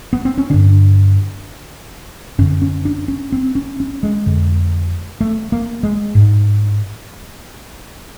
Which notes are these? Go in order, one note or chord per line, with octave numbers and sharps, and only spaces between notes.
B3
C4
C#4
G2 D3 D4
F#2 D3 C#4
C#4
D4
C#4
C4
C#4
C#4
G#3
F2 D3
A3
A#3
G#3
G#2